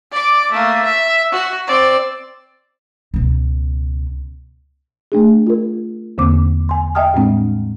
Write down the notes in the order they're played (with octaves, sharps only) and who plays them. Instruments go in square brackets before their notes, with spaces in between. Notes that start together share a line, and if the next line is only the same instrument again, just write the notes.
[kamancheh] D5 D6
A3 A#3
E5
F#4
C4 D5
[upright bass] C#2 B2
[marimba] A3 D4 G#4
F4 A#4
E2 D3 A#3 C4 D6
G#5 C6
D#5 E5 G5 A5 D#6 F6
A2 G3 G#3 C4 D4